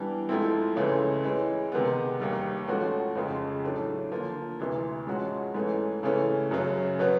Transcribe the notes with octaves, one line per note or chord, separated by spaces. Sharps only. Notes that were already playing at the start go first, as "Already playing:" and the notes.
Already playing: E3 G3 B3 D4
G#2 F3 A3 C4 E4
C#2 C#3 E3 A3 C#4
E3 G#3 C#4
C3 D#3 G#3 B3
D#2 D#3 G3
G#2 F3 A3 C#4 F#4
F2 C#3 F3 G#3
A2 F#3 A3 D4
D3 F3 A#3
D2 C3 E3
G#2 F3 G#3 C#4 F#4
G#2 E3 A3 C#4
C#3 E3 A3 C#4
F#2 C#3 F#3
B2 F#3 B3